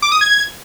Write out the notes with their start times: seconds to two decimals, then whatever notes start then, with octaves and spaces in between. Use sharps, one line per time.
0.02 D6
0.12 D#6
0.21 G#6